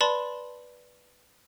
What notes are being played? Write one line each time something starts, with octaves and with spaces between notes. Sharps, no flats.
B4 D5 A5 B5 C6